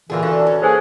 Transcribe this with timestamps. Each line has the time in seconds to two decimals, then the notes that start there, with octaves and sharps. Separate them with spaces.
0.10 A#2 D3 E3 A#3 F4 G#4
0.23 C#2 D4 F#4 A4 F5
0.47 C#4
0.62 A#3 G#4 A4 B4 C5 G#5